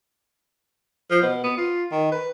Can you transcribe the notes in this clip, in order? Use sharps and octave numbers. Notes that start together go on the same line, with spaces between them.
F3
B2
B3
F4
D#3
B4